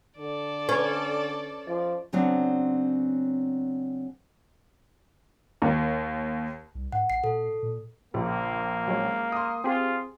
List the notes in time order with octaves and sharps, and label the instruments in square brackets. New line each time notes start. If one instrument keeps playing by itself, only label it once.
[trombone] D3 [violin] A4 D5
[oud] C#4 [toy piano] B4 B5 C#6
[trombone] F3 [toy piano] D#5
[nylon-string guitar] C#3 F#3 B3 C4 D4
[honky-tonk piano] D#2
[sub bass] C2
[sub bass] G#2 [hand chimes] F#5
[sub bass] A1 [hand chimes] C7
[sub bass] A#2 [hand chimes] A4
[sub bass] A#2
[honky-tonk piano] A#1 [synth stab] C#3 [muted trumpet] A#3
[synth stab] F#3 G#3 C#4
[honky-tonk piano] C6 D#6
[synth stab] C4 G4 G#4 [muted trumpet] F4